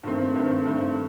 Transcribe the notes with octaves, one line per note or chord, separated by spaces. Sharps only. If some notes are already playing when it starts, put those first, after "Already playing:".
G2 D#3 A3 C4
G2 D#3 A3 C4
G2 D#3 A3 C4